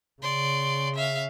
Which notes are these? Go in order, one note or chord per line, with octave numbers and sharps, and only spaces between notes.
C#3 D5 C6
E5 F5